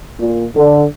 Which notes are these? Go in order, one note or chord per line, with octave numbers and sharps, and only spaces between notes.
A#2
D3